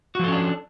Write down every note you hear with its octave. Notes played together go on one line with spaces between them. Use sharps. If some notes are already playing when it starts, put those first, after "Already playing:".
F3 C#4 D4 F#4 A4